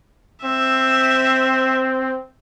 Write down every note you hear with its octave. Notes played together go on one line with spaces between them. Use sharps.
C4 E5